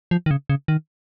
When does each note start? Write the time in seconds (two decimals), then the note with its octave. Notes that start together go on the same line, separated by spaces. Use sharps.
0.11 F3
0.26 D#3
0.31 C#3
0.50 C#3
0.68 D#3